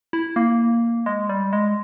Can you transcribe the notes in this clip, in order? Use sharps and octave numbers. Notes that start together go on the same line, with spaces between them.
E4
A#3
G#3
G3
G#3